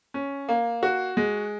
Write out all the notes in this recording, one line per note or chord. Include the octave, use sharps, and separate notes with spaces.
C#4
A#3
F#4
G#3